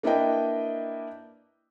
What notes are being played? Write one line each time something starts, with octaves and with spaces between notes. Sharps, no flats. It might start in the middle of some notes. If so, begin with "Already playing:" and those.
A#3 D4 E4 B4 D#5 G5